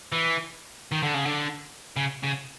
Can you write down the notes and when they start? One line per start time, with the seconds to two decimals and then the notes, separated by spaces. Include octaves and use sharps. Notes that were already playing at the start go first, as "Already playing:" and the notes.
0.12 E3
0.92 D#3
1.03 D3
1.14 C#3
1.25 D3
1.97 C#3
2.23 C#3